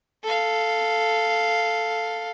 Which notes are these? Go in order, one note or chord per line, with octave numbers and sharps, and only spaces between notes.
A4 F5